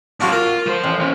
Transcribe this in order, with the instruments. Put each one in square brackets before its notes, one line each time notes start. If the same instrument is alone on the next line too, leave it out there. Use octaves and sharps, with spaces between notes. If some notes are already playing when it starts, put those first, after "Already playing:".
[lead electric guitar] A2 F#3 [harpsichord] D4 F4 F#4
[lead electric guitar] F4 [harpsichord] A#4
[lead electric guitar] F3 C5
[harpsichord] A1
[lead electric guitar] D#2 C#4